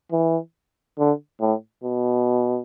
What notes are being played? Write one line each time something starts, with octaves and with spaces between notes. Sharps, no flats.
E3
D3
A2
B2